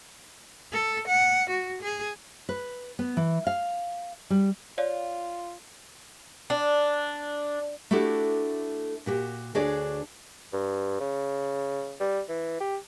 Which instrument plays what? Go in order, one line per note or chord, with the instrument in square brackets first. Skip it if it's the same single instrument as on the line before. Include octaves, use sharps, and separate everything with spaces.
[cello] A4
F#5
F#4
G#4
[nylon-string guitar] B4
B3
E3
F5
G3
[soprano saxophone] F4 [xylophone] C#5 D5 F5
[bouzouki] D4
[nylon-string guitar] A3 D4 E4 F#4 G4 A4
A#2 F#4 G4
D2 D4 F#4 G#4 C#5 D5
[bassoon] G2
C#3
G3
E3
G4